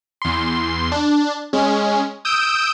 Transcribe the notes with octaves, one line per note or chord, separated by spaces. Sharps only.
E2 C6
D4
G#3 C#4
D#6 E6 G6 D7 E7